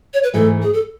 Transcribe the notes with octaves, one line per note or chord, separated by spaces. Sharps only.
C#5
B4
G#2 E3 A3 A4
G#4
A4